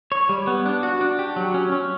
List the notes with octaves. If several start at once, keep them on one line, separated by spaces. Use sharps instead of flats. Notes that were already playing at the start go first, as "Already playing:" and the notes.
C#5
G3
B3
D4
F#4
D4
G4
F#3
C#4
C#4